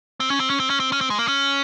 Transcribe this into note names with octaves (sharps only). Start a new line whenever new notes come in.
C4
C#4
C4
C#4
C4
C#4
C4
C#4
C4
G#3
A#3
C#4